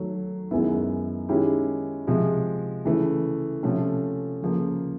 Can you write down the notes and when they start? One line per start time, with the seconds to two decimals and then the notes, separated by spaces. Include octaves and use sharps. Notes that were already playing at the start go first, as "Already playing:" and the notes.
Already playing: D#3 F#3 A3
0.51 F#2 D#3 G#3 B3 E4
1.29 D#3 G#3 C#4 E4 G4
2.07 C3 F3 G#3
2.85 C#3 E3 A3
3.63 C3 F3 A3 C#4
4.43 C#3 F3 A#3